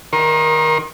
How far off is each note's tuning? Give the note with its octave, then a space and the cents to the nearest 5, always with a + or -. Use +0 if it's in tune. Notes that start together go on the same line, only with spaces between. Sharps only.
D#3 +0 A#4 +20 C6 +45